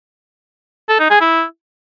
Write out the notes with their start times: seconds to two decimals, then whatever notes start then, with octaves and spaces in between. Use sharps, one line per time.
0.89 A4
1.00 D#4
1.10 G#4
1.21 E4